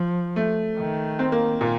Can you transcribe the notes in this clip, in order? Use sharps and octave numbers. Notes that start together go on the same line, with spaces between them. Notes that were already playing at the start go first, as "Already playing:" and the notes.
Already playing: F3
A3
D#3
C4
A#3
A#2